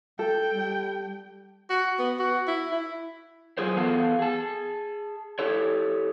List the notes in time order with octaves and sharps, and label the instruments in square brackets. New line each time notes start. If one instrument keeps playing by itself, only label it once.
[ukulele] A4 [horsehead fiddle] G5
[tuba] G3
[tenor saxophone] F#4
B3
F#4
E4
E4
[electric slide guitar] F#3 F4 G#4 A#4 C5
E3 B3 A4 F5 A5
G#4 A5
E4 G4 A4 C#5